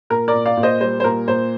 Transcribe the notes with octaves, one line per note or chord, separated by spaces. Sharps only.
A#2 A#4
A#4 D5
A#2
D5 F5
A#2
C5 D#5
G3 C5
C5
A#2 A#4
A#2 C5